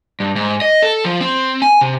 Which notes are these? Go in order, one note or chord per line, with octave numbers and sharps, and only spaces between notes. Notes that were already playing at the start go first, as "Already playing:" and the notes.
G2
G#2
D#5
A4
F3
C4
G#5
C3